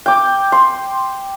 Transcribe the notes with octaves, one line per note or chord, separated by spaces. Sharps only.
G5 D6
C6